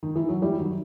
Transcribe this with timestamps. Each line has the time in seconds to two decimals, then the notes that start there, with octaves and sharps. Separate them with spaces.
0.03 D#3
0.16 E3
0.29 F#3
0.42 E3 G3
0.58 D#3 F#3